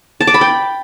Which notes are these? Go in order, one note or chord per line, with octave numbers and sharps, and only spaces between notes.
A5
D6
B5
G5